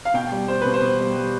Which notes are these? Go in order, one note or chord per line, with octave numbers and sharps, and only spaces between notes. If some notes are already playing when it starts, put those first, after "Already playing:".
F5
B2 G5
G3
G3 C5
B2 B4
C5
B2
G3
G3